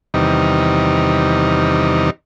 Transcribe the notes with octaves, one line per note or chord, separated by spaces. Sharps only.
E2 C3 D#3 G3 D#4